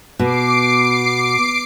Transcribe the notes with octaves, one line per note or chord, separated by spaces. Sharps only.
B2 D6 C7 D7